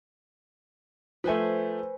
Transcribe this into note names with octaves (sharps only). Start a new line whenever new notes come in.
F3 A3 B4 C5 G#5